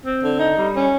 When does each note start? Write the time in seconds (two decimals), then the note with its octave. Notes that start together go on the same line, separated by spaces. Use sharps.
0.04 C4
0.22 D3
0.39 D#4
0.56 G3
0.74 C#4